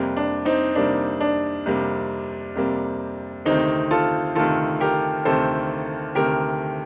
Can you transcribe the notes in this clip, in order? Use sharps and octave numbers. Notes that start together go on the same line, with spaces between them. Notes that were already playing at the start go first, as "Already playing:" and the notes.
Already playing: F2 C3 G3 A#3
D4
C4 D#4
F2 C3 G3 A#3 D4
D4
F2 C3 G3 A#3
F2 C3 G3 A#3
D2 C3 D#3 C4 D#4
F4 A4
D2 C3 D#3 F4 A4
G4 A#4
D2 C3 D#3 A4 C5
D2 C3 D#3 G4 A#4